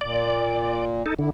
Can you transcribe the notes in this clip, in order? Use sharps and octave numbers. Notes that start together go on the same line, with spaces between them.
A#2 D5
D#4 A4
D3 E4